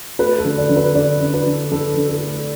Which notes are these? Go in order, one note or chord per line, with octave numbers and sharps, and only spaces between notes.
A3 B4
A4
D3
D5
D3
B4
D3 D5
D4
B4
D3
D3 A4
D3
A4
A3